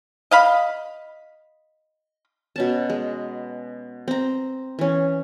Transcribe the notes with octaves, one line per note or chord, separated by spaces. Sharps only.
D#5 F5 B5
B2 C#4 A5
G#3
C4 A#5
E3 C#4